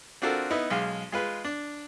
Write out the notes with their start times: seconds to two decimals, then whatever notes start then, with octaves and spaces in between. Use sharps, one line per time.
0.22 C4 D4 F4 F#4 A4 A#4
0.51 B3 D#4 E4
0.70 B1 G#3 F5
1.12 G#3 F4 B4
1.45 D4